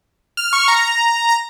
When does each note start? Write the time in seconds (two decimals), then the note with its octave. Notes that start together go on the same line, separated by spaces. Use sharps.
0.37 F6
0.53 C#6
0.68 A#5
1.29 A#5